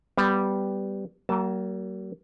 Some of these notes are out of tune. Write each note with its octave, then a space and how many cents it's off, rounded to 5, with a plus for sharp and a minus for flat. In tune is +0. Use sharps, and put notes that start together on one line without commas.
G3 -5 B3 +10
F#3 +45 A#3 +0 A5 +0